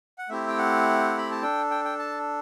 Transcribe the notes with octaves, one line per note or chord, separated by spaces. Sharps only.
F#5
A3 C4 E4 G4 E5
G5
F#5
B5
A5
D4 A4 G5
G5
G5
A5